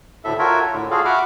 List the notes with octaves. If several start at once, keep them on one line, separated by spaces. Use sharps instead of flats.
D2 A2 A4 E5
F4 F#4 A4 A#4 C#5 E5
A2 D3
F4 F#4 G#4 A4 F5
F#4 E5 F#5 B5 D6 F6